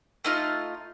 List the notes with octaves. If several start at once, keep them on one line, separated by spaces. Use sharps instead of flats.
A3 D#4 F4